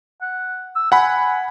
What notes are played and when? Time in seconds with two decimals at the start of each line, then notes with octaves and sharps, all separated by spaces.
0.22 F#5
0.76 E6
0.92 F#5 G#5 B5